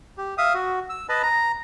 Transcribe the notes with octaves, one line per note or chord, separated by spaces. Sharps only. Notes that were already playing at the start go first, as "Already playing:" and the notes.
G4
E5 F5 D#6
F#4
E6
B4 D#5 A5 B5
A#5